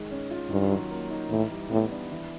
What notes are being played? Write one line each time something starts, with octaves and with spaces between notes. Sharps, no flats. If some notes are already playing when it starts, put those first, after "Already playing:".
Already playing: D#3 G#3
C#4
F4
G2 D#3
F#3
A#3
D#4
A2 E3
G3
A2 B3
D4
E3